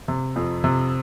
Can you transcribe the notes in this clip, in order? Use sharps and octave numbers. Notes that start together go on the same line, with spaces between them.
C3
F2
C3